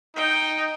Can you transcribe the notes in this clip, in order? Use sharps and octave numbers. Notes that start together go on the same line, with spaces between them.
D#4 G5